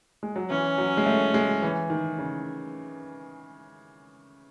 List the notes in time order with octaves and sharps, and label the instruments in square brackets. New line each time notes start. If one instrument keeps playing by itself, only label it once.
[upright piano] G#3
F#3
[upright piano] E3 [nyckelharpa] C#4
[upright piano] F#3
G#3
A3
G#3
E3
D#3
C#3